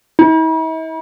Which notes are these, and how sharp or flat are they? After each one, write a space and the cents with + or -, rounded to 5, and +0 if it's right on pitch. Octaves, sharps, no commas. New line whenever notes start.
E4 -45